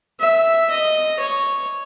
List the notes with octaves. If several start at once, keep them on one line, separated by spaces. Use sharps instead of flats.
E5
D#5
C#5